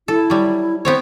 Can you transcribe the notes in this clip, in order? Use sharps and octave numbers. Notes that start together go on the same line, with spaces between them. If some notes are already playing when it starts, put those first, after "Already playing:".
E4 A4
F#3 G3
B3 C4 C5 C#5